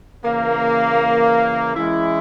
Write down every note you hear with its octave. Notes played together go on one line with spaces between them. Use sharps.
C#3 E3 A#3
E3 G#3 C#4 E4